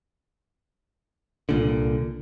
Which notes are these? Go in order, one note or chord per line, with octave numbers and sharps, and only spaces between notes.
C2 A#2 D3